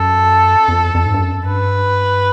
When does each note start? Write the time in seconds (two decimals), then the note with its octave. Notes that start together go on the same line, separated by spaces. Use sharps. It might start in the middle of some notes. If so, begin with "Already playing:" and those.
Already playing: F#2 A4
0.68 F2
0.95 F2
1.06 G#2
1.14 G2
1.21 F#2
1.47 G2 B4